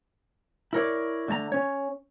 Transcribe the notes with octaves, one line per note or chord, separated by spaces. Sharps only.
E4 A#4 C#5 D5
D3 A3 A5 A#5
C#4 C#5